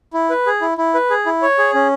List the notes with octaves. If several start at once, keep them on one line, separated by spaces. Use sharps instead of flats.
E4
B4
G#4
E4
E4
B4
G#4
E4
C#5
G#4
C#4